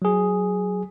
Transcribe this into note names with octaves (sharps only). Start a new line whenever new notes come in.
F#3 G#4